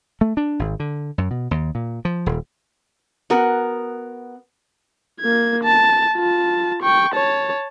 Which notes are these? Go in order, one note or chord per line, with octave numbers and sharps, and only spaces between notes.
A3
D4
G#1
D3
F#2
B2
D#2
A#2
F3
D#1
B3 F#4 A#4
A#3 G#6
A5
F4 A5
G5 C#6
C#5 A5